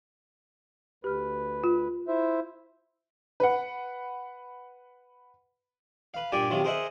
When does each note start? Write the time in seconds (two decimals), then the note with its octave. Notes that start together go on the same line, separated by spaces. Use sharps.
1.04 D2 G4 B4 F6
1.64 F4
2.08 E4 C5 E5
3.40 B4 F#5
6.14 B4 F5
6.32 G2 A#2 G4 D5 G5 G#5
6.50 C3 D#3 F#3 C#4 F4
6.64 G#4 A#4 C5 D#5 E5 F#5